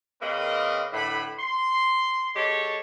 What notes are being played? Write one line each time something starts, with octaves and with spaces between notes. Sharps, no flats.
C#3 A#3 C4 B4 D#5
A2 D3 A4 B4 B5
C6
G#3 G4 A4 C#5